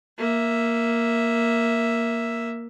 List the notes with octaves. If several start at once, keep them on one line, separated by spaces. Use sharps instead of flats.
A#3 E5